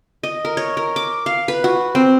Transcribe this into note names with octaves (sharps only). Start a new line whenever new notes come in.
D#5
A#4
C#5
A#4
D6
F5
B4
F#4
C4